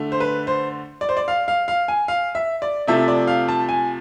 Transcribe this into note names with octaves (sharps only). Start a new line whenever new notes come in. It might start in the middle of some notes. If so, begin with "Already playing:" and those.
Already playing: D3 A3
C5
B4
C5
D5
C5
D5
F5
F5
F5
G#5
F5
E5
D5
C3 F3 A3 E5
D5
F5
A5
G#5